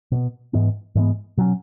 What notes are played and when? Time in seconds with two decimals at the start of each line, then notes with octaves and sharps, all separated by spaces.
0.12 B2 B3
0.53 G#2 E3 G#3 B3
0.95 G#2 E3 G#3 B3
1.37 B2 F#3 C#4